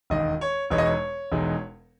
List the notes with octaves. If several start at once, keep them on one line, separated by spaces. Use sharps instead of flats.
E1 D#2 D#3 D#5
C#5
E1 E2 B2 G#3 D#4 C#5
D#5
C#5
E1 E2 B2 G#3 D#4